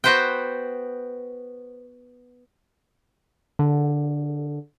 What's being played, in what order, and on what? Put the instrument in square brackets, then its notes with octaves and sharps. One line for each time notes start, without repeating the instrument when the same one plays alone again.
[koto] B3 F#4 B4 C5 F#5 G5
[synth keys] D3